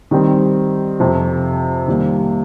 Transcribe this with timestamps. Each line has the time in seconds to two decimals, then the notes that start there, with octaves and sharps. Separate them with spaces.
0.11 D#3 G3 C4
1.00 F2 C3 F3
1.88 D#3 G3 A#3